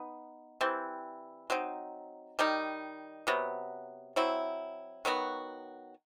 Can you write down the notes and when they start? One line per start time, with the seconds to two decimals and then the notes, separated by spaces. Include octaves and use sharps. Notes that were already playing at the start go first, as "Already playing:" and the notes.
Already playing: B3 D#4
0.61 E3 G3 C4
1.50 F#3 C4 D#4
2.39 D#3 G3 D#4
3.27 C3 F#3 B3
4.16 F#3 C4 E4
5.05 D#3 F#3 B3 F#4